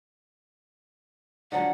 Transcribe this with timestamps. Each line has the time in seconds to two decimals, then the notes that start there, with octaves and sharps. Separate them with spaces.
1.52 D3 F3 F#3 F#5